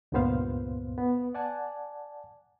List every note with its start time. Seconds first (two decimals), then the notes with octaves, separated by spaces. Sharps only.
0.12 C#2 G2 A#2 B3 C5 F5
0.98 B3
1.35 D5 F#5 G#5 A5